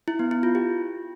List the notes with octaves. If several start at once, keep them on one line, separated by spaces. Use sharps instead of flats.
E4
B3
E4
F4
G4